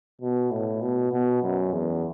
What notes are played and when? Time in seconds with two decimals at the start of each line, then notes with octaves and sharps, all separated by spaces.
0.21 B2
0.51 A2
0.81 B2
1.12 B2
1.42 F#2
1.73 E2